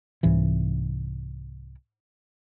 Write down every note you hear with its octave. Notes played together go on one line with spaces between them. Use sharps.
C2 G#2 C3 E3